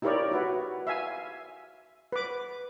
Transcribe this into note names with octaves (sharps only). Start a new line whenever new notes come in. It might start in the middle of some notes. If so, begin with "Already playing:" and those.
D#4 E4 G4 A#4 C#5 D5
E4 F#4 B4
E5 F5 G#5
B4 D6